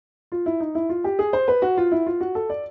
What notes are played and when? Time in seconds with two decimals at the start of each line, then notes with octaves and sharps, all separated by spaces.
0.32 F4
0.46 E4
0.60 D#4
0.75 E4
0.89 F4
1.04 G4
1.19 G#4
1.33 C5
1.48 B4
1.62 F#4
1.77 F4
1.92 E4
2.06 F4
2.21 F#4
2.35 A4
2.50 D5